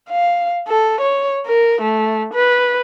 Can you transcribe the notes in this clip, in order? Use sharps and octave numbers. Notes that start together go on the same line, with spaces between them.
F5
A4
C#5
A#4
A3
B4